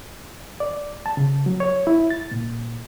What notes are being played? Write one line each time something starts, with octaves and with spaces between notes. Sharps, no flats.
D5
A5
C#3
F#3
C#5
E4
A6
A#2